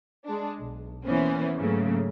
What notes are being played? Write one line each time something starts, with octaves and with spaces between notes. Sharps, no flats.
G#3 D4
B1
E3 A#3 B3 C#4 C5
G#2 C#3 F#3 A3 A#3